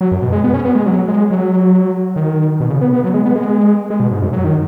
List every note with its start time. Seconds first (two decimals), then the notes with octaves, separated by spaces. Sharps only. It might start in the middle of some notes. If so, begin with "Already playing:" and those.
0.01 F#3
0.12 F#2
0.22 B2
0.32 G#3
0.44 B3
0.54 C#4
0.65 B3
0.75 G#3
0.86 F#3
1.08 G#3
1.30 F#3
2.16 D#3
2.60 B2
2.70 C#3
2.81 B3
2.93 B3
3.04 F#3
3.14 G#3
3.25 B3
3.36 G#3
3.90 G#3
4.00 B2
4.11 G#2
4.22 F#2
4.33 F#3
4.44 D#3